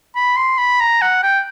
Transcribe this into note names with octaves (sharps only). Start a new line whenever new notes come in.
B5
C6
B5
A#5
F#5
G5